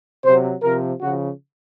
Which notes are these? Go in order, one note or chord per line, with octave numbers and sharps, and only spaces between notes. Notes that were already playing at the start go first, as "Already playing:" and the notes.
C3 F#3 C5
C3 F3 A#4
C#3 F3 F#4